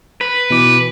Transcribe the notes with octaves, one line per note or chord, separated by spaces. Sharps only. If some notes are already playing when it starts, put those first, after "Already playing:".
B4
B2 E3 D6